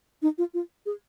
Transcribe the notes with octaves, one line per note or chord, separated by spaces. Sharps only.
D#4
F4
F4
G#4